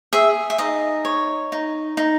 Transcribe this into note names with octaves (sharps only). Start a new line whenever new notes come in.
G#4 E5
E5
D#4 D#5
C#5
D#4
D#4